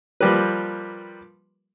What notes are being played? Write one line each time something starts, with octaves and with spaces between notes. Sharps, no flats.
F3 G3 A#3 G4 A#4 B4